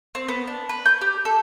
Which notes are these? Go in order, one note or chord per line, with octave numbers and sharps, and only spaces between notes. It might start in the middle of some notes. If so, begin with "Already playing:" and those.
C4
B3
D4
B4
G6
G4
A4